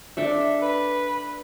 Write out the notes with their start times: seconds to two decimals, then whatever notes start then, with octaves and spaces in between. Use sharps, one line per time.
0.17 D4 A4 E5
0.62 B4